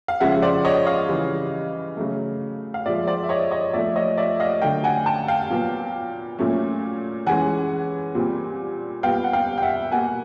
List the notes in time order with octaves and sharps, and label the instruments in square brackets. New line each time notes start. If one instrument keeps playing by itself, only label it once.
[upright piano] F5
C#3 F3 G#3 C#4 E5 F#5
C5 D5
C#5 D#5
D#5 F5
C#3 E3 G3
C#3 F#3 A3
F5
A#2 F3 G#3 D5 E5
C5 D5
E5
C#5 D#5
C#5 D#5
A#2 F3 A3 D5 E5
C#5 D#5
D5 E5
D#5 F5
D3 F#3 A3 F5 G5
F#5 G#5
G5 A5
F5 G5
A#2 F#3 B3
A#2 F#3 A3 C#4
E3 G#3 C#4 F#5 G#5
A#2 G3 C4
A#2 G3 B3 F5 G5
F#5
F5 G5
G5
E5 F#5
B2 G3 A#3 F#5 G#5